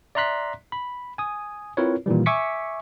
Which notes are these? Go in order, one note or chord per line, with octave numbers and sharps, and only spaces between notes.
D5 E5 A#5 C6 F#6 B6
B5
G#5 D#6
C4 E4 F4 A#4 B4 C#5
A#2 D#3 E3 G3
E5 G#5 C#6 D6 B6 C#7